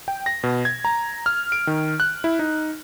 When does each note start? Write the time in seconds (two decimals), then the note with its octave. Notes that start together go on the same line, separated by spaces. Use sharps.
0.08 G5
0.26 A#6
0.44 B2
0.65 G#6
0.85 A#5
1.26 F6
1.52 D7
1.67 D#3
2.00 F#6
2.24 E4
2.39 D#4